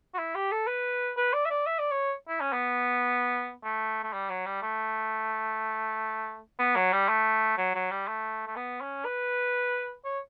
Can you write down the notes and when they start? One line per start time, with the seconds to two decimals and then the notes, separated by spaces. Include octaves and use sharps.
0.14 F#4
0.18 E4
0.35 G4
0.51 A4
0.67 B4
1.17 B4
1.33 D5
1.45 E5
1.50 D5
1.66 E5
1.79 D5
1.91 C#5
2.28 E4
2.40 C#4
2.52 B3
3.64 A3
4.04 A3
4.13 G3
4.30 F#3
4.46 G3
4.62 A3
6.59 B3
6.76 F#3
6.93 G3
7.09 A3
7.58 F#3
7.75 F#3
7.91 G3
8.08 A3
8.47 A3
8.56 B3
8.81 C#4
9.05 B4
10.05 C#5